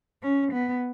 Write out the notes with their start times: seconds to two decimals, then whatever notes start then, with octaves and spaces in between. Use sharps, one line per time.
0.23 C#4
0.52 B3